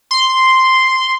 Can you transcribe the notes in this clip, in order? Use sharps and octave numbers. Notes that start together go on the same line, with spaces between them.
C6